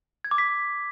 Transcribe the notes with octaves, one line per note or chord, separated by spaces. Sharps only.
G#6
D6
B6